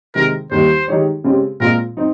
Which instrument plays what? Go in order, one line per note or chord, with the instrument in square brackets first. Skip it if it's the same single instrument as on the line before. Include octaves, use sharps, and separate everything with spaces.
[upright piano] C3 D#3 G#3 C4 [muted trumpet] A#4
[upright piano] D#2 D#3 G3 [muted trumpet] C5
[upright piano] D#3 G#3 D#4 G4 C#5
C#3 G#3 C4 G4
[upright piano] A#2 G#3 C4 F4 G#4 [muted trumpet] A#4
[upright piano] C4 D#4